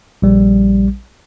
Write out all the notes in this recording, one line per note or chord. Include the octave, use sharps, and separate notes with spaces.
A#1 G3